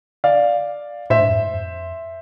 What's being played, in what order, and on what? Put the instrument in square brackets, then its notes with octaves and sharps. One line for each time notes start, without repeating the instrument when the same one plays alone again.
[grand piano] D5 F5
[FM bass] A2 [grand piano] C5 E5
[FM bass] G#2
F2
G#2
F2